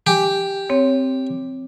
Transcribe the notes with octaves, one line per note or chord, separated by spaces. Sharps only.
G4 G#5
C4 C#5